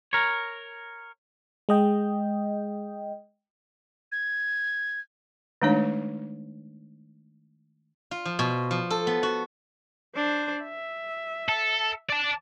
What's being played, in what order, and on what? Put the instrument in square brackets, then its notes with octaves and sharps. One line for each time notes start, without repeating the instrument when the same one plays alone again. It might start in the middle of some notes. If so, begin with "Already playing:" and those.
[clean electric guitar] A#4 C#5
[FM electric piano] G#3 D#5 G5
[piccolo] G#6
[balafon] D#3 G#3 A3 D4 D#4 C#5
[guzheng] F4
F3
B2
F3
A4
B3
F#4
[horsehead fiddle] D4 C5
E5
[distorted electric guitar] A4
D5 A5